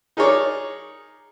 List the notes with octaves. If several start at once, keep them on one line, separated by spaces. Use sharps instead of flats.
D#4 G#4 A#4 C#5 D5